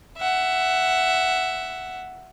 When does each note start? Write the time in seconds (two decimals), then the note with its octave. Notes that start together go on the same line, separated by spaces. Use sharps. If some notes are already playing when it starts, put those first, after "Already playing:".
0.18 E5 F#5